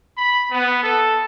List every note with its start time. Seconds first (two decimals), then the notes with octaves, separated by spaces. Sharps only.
0.17 B5
0.51 B3
0.83 A4